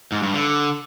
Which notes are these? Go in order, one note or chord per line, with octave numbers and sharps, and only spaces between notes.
G#2
G2
D3